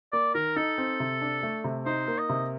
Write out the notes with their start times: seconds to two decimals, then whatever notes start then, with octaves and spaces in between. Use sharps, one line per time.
0.12 A#3 D5
0.35 D#3 A#4
0.56 D#4 A4
0.78 C4
1.00 C3
1.22 D4
1.43 A3
1.64 C3
1.86 D#4 C5
2.08 A#3
2.18 D#5
2.29 C3